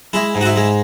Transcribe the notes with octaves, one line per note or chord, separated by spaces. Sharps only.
G#3 E4
G#2
F#4
E4
G#3